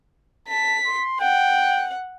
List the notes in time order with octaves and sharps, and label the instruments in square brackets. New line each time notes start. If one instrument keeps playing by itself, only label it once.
[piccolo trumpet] A5 [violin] B6
[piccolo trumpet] C6
[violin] F#5 [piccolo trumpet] G5